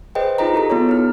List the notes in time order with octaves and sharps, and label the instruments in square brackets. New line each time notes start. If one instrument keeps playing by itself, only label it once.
[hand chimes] G#4 B4 C5 D#5 G5
D#4 F4 G#4 D#5 A#5
E4 G4 A4 A#5
B3 F4 G#4 C#5
D#4 F6